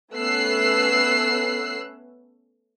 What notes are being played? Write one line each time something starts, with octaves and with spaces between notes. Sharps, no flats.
A3 B3 C#4 E6 F#6 C7